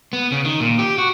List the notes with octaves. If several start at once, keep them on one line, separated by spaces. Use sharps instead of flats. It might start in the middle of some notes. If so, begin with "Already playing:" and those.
B3
C#3
D#3
A#2
G4
F#4